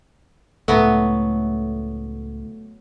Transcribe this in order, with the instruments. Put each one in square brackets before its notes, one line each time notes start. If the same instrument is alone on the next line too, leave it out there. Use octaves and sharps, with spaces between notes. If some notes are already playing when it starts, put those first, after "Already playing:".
[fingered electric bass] C#2 A2 [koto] F#3 B3 [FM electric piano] A3